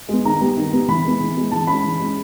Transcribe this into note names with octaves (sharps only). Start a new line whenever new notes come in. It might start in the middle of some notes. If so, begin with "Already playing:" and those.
G#3 B3
D#3 A#5
G3 B3
D#3
G3 B3
E3 B5
G#3 B3
E3
G#3 B3
E3 A5
G#3 C#4 B5
E3
G#3 C#4